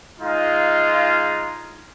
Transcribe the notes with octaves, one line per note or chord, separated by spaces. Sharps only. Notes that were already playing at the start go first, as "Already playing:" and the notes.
G#3 D#4 F4